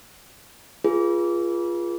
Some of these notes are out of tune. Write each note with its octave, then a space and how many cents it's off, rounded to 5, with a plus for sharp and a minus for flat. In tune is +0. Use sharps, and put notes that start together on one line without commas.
F4 -10 G#4 +0 B4 -30